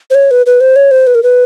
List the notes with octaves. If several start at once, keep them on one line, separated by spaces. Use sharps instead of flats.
C5
C#5
B4
B4
C5
C#5
C5
B4
A#4
B4